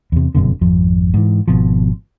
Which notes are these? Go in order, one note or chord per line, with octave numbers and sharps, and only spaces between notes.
E2 C3
F1 F#2 B2 D3
G#1 F2 F3
G#2 E3
G#1 B2 F3